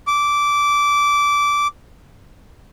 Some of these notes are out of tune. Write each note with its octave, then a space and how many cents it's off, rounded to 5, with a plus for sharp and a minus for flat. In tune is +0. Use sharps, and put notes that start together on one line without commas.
D6 -15